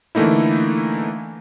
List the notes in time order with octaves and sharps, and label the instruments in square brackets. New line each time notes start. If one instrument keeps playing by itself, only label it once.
[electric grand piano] D3 E3 A3 A#3 D#4 E4